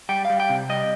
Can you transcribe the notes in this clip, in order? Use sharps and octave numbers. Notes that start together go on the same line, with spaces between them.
G3 G5
G3 F5
G5
C3
G3 D#5